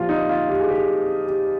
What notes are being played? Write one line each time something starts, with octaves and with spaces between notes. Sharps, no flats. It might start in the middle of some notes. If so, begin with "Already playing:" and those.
Already playing: A#2 F3 F4 G4
D#4
F4
G4
G#4
G4
G4